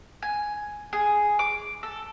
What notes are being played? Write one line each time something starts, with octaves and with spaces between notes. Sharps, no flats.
G#5
G#4
D6
A4